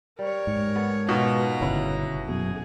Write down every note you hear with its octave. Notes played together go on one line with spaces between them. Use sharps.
G3 A#4 C#5
G#2
B3 A4
B2 D#3 F4 A4 A#5
G1 C#3 C#4 E4 B4
F#2 B2 G#4